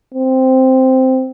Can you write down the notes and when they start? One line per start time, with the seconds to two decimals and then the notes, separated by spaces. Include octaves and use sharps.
0.14 C4